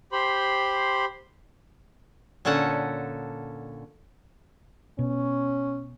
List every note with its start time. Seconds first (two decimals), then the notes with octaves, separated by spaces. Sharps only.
0.12 G4 C5 B5 C6
2.45 A#2 D3 C#4 A4 F#5
4.99 B2 C#4